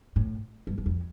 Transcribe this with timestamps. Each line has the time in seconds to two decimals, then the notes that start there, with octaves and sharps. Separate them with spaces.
0.16 A2
0.67 G2
0.78 G2
0.86 F2